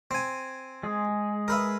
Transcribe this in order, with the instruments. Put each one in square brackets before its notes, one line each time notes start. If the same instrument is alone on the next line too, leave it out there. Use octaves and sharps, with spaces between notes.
[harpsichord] C4 G#5
[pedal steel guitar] G#3 G#4
[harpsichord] A#4 B4 E5